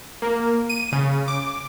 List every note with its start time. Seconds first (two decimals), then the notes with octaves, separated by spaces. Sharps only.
0.22 A#3
0.69 D#7
0.92 C#3
1.28 D6